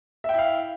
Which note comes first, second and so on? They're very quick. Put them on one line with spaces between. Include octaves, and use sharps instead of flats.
E5 G5 E4 F5